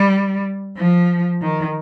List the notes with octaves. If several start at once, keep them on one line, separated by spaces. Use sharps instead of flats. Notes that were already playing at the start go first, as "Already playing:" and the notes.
Already playing: G3
F3
D#3